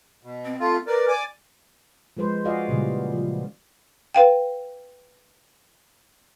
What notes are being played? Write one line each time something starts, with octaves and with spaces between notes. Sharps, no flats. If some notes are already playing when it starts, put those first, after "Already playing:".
B2
C4
A3 F4
A#4 B4 D5
D5 G#5 D6
F3 G#3 B4 C5
F4 F#4 G#4 D5 D#5 F5
A#2 C#3 E3 G3
F3
B4 F5 G5